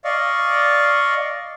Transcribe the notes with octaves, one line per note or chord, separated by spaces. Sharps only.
D5 D#5 F5 C#6